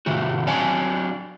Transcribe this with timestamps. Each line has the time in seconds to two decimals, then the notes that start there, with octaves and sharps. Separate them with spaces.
0.06 A2 C3 D#3 A3 F#4
0.47 F#3 C4 D4 D5 F5 G#5